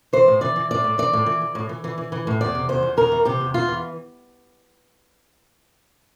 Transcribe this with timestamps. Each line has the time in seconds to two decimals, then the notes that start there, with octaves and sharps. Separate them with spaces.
0.13 E3 C5
0.28 A2
0.41 E3 D5
0.56 E3
0.71 A2 D5
0.84 A2
0.98 E3 D5
1.13 A2
1.26 E3
1.41 E3
1.55 A2
1.69 E3
1.84 E3
1.98 E3
2.12 E3
2.27 A2
2.41 E2 D5
2.55 C3
2.69 E2 C5
2.83 E2
2.97 E2 A#4
3.12 E3
3.25 C3 G4
3.41 E2
3.54 E2 F4
3.68 E3